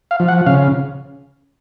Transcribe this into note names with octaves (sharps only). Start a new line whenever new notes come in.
F5
F3
F#5
C#3 F5